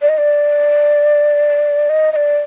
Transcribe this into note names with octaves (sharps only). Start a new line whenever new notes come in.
D5
D#5
D5
D#5
D#5
D5